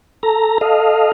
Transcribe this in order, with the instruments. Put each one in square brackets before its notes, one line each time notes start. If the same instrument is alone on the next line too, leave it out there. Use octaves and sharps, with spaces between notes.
[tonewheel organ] A4 A#5
A4 D#5 F5